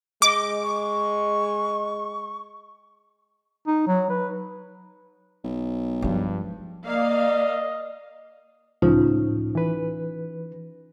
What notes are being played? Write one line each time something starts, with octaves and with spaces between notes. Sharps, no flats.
G#3 D#5 D6
C#6
D#4
F#3
B4
B1
G2 F3 G#3
A#3 D5 D#5 F5
C#2 A2 F3 C#4 D#4 F4
E3 B4